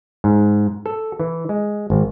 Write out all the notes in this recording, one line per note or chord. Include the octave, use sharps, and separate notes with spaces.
G#2
A4
E3
G#3
G#1